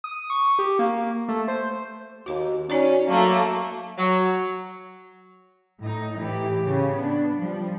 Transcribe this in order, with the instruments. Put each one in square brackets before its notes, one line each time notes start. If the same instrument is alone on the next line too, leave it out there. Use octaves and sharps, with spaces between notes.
[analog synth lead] D#6
C#6
G4
A#3
A3
C5
[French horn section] D#2 [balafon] F#4 D6
[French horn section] C#4 [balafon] D#4 F#4 D5
[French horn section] F#3 [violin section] A3 A#3
[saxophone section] F#3
[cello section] A2 D#4
A2 E3 G4
C#3
B3 D4
F3 G3